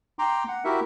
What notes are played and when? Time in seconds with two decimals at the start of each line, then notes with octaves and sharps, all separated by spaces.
0.19 G5 A#5 C6 D6
0.48 F#5
0.64 E4 F#4 G4 A#4 E5